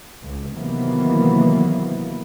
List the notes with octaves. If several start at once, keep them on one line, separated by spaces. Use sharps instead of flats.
C#2
C3 D#3 E3 F#3 A#3 B3